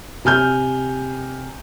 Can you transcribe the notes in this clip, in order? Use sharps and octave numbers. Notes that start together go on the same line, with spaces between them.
C3 G#5 F6 G6